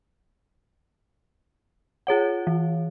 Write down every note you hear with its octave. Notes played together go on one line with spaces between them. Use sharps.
F4 G#4 C#5 F#5
E3